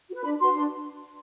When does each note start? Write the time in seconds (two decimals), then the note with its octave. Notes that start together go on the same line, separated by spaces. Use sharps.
0.09 F#4 B4
0.24 D4 B5
0.39 F#4 B4 C6
0.55 D4